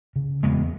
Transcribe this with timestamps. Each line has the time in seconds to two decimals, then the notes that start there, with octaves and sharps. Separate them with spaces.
0.16 C#3
0.43 E2 G#3 B3